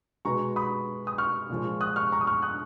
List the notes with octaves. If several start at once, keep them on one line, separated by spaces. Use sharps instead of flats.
B2 G#3 B3 A#5 C#6
B5 D#6
D#6
C#6 F6
A#2 F3 G#3
D#6 F#6
C#6 F6
A#5 C#6
D#6
C#6 F6
D#6 F#6